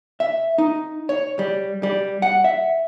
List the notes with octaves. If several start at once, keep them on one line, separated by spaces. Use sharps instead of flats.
E5
D#4
C#5
G3
G3
F#5
E5